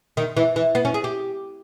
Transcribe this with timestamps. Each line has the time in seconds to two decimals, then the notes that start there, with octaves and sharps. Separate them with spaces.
0.17 D#3
0.37 E3
0.56 E3
0.75 B3
0.85 C#4
0.94 G#4
1.04 G4